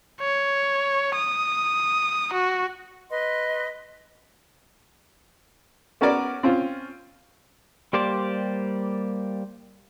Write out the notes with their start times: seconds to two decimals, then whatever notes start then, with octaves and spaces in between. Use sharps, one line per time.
0.20 C#5
1.15 D#6
2.33 F#4
3.10 B4 D#5 C6
6.01 B3 C#4 F#4 A#4 C#5 D5
6.43 C4 C#4 F4
7.93 G3 A#3 G4 C5 D5